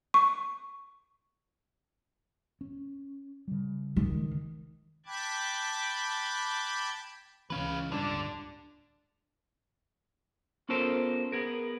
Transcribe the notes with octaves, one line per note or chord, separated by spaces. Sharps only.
C#6
C#4
C#3 G3
D#3
G5 A5 B5 D6 F#6 G#6
C#2 E3 C4 C#4 B4 F5
D1 G2 D3 G3 D4
B3 C#4 F4 A4 A#4 C5
B3 G#4 A#4